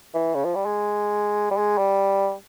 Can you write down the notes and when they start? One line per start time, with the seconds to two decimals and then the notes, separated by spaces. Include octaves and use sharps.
0.14 E3
0.35 C#3
0.45 F3
0.55 G3
0.66 G#3
1.51 G3
1.57 G#3
1.78 G3